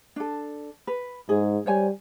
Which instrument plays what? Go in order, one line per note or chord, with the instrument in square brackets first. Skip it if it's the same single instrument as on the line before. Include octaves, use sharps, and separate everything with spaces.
[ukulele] D4 A4
B4
[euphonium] G#2 [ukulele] G#4
[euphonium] G3 [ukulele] C5 C#5 G#5